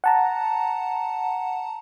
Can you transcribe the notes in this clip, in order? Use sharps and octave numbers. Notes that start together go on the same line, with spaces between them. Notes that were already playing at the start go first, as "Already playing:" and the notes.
F#5 A5 A#5